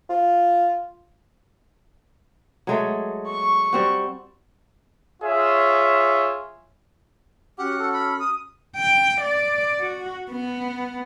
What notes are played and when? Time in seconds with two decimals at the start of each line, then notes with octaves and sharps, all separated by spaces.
0.10 F4
2.67 F#3 G#3 A3
3.28 C#6
3.73 G3 C4 F#4
5.23 F4 G#4 C#5 E5
7.58 C#4 F#4 G4 F#5 F6
7.79 A4
7.93 B5
8.19 D#6
8.76 G5
9.21 D5
9.80 F#4
10.31 B3